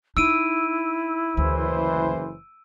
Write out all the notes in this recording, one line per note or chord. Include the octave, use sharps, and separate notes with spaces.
D#4 E4 E6 D7 D#7
F#1 D2 E3 C5